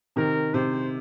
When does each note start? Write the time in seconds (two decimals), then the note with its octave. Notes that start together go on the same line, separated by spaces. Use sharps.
0.16 C3 D#3 A#4
0.54 C3 C5